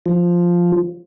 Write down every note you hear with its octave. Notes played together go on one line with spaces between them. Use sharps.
F3